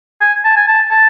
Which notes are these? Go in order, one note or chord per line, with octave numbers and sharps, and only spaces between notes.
G#5
A5
G#5
A5
A5